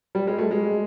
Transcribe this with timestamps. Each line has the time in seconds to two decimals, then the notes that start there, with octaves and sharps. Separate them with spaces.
0.15 G3
0.27 G#3
0.38 A3
0.51 G#3